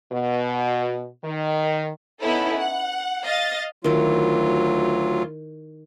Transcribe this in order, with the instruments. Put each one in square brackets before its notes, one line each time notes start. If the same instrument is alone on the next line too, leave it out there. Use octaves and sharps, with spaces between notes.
[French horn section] B2
D#3
[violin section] B3 C#4 D#4 E4 A4
F#5
D#5 F5 A6
[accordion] D2 F#3 F4 [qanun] D#3 E4